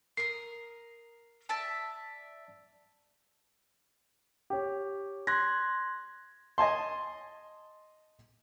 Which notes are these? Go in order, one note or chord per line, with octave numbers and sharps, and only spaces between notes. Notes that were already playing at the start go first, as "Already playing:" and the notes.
A#4 D#6 C7
D5 E5 A5
G4 C#5
C6 F#6 G#6 A#6
D#5 G#5 A5 C6